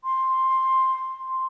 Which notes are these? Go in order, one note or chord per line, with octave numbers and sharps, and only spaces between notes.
C6